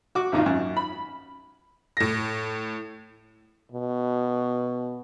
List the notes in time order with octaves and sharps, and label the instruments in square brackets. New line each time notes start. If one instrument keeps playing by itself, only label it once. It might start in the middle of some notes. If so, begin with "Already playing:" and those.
[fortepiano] F#4 D6
G#1 D#2 D#4 F4
F#2
B5
[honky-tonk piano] A2 A#6
[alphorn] B2